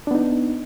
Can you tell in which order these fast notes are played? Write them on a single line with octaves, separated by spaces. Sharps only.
D4 B3 D#4